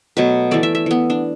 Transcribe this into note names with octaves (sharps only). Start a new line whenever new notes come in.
B2 F#3 A3 B4
E3 A3 D5
E5
E5
E3 B3
D4